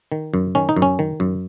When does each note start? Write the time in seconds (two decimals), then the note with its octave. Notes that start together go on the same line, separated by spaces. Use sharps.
0.12 D#3
0.34 F#2
0.55 D#3 C#4
0.69 D#4
0.76 F#2
0.82 C#4
0.99 D#3
1.20 F#2